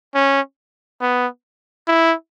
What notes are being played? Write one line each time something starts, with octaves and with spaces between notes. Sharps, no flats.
C#4
B3
E4